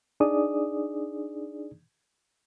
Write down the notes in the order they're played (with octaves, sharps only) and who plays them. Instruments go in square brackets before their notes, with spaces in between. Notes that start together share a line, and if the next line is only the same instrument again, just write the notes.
[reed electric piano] D4 D#4 G#4 D5 D#6